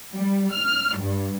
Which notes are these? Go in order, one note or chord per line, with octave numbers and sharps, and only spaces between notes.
G3
F6
G2